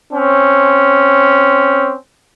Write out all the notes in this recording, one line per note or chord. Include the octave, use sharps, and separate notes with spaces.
C4 C#4